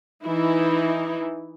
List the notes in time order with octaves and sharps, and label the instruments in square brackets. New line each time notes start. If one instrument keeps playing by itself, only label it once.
[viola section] E3 D#4 E4